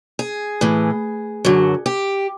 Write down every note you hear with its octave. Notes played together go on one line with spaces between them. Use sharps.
G#4
A2 E3
F#2 D3 F#3
G4